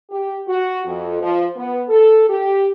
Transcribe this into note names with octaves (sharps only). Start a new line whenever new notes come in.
G4
F#4
F2
F3
B3
A4
G4